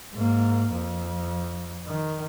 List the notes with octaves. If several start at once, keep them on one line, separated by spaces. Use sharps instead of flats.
G#2 A#3
F2
D#3